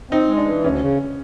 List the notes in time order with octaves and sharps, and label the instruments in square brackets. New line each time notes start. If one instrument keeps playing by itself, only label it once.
[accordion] C4 [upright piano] D#4
[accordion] G#3
[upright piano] D4
[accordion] E3
[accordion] D2 [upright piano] C#4
[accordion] C#3